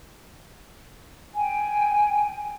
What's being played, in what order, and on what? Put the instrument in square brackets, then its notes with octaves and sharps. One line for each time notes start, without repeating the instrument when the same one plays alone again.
[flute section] G5 G#5